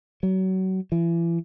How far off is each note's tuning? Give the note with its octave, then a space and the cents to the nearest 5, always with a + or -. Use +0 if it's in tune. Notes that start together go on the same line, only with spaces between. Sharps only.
F#3 +30
E3 +35